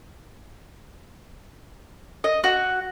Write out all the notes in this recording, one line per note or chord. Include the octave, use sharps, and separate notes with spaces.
D#5
F#4